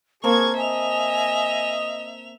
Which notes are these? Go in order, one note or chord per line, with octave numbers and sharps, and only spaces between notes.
A#3 C4 G#4 A#4 A5 C#6 G#6
D#5 E5 G#5 F7